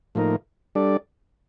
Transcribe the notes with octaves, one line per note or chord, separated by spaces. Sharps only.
A2 F3 A#3 D#4 A#4
G3 D4 A4 D5